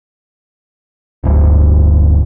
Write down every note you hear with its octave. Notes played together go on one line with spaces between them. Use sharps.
D1 G1 D2